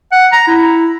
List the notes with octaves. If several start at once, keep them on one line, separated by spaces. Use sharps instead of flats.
F#5
A#5
E4